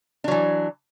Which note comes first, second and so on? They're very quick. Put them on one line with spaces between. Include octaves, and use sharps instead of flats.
D4 F#3 E3